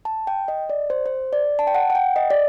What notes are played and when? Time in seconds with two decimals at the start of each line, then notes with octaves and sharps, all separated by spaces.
0.05 A5
0.27 G5
0.48 D#5
0.70 D5
0.90 C5
1.06 C5
1.33 D5
1.59 A5
1.67 G5
1.75 F#5
1.90 F#5
1.95 G5
2.16 D#5
2.30 D5